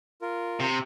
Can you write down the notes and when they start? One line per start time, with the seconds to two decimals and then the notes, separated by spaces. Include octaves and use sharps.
0.22 F4 A#4
0.60 C3